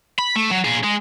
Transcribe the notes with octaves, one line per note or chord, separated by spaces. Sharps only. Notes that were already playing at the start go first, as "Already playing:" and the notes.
B5
A3
F#3
A#2 G#4
G#3 G#4